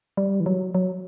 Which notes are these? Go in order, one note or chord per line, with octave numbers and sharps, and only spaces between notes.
G3
E3
F#3
F#3